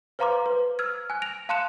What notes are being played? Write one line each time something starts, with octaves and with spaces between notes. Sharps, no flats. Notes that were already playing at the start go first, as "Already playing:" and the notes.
B4 C5 F5 A#5 C6 D6
B4
E6 F6 G#6
G#5 F#6
A#6 D7 F7
F5 A5 C6 F#6 C#7 E7